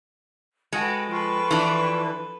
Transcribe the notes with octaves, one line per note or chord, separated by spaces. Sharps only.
G#3 F#4 A4 B4 G5
F3 F4 A4 B4 G5 C#6
E3 D4